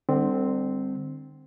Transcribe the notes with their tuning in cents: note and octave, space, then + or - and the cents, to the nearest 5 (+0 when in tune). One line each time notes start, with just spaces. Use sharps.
D3 +35 G3 +25 C4 +0